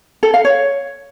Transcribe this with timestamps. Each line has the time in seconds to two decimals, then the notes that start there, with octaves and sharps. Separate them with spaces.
0.23 A4
0.34 F5
0.45 C#5